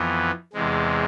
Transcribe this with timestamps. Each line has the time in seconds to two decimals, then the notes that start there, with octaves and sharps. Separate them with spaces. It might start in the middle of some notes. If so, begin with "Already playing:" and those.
Already playing: F2 E3 B3
0.53 E2 C3 G#3